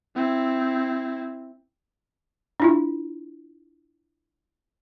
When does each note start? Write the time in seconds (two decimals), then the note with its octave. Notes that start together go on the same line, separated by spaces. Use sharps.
0.16 C4 E4
2.60 D4 E4 F4